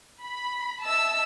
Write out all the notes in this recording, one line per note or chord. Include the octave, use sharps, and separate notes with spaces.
B5
D#5 E5 A5 E6